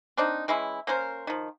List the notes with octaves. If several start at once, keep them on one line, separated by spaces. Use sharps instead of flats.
C4 D4 D#4
E3 G#3 C#4 E4
A#3 C#4 A#4 C5
D#3 F3